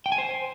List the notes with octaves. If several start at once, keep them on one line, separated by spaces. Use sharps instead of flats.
G5
G#5
C5